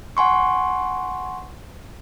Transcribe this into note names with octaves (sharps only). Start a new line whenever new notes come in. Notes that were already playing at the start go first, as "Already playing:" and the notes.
F#5 G#5 C6 C#6